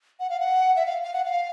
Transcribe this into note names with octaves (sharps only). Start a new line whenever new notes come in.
F#5
F5
F#5
E5
F5
F5
F#5
F5